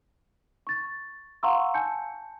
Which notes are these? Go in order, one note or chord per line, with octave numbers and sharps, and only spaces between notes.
C#6 A6
F5 F#5 A#5 C6 C#6 E6
G#5 A5 G6 C#7